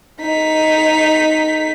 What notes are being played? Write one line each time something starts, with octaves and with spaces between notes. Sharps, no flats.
D#4 B6